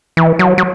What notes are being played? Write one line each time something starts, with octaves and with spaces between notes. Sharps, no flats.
E3
F#3
F#3